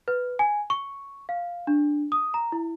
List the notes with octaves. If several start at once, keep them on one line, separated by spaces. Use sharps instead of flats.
B4
G#5
C#6
F5
D4
D#6
A#5
E4